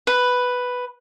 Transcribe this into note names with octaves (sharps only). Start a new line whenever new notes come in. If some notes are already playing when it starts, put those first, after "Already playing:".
B4